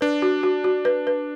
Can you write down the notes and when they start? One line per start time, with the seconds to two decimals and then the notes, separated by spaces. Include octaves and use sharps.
0.01 D4 B4
0.22 F#4
0.43 F#4
0.64 F#4
0.85 B4
1.07 B4